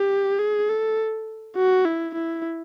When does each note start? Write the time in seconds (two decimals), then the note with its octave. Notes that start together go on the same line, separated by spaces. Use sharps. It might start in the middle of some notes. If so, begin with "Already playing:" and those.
Already playing: G4
0.39 G#4
0.69 A4
1.56 F#4
1.85 E4
2.14 E4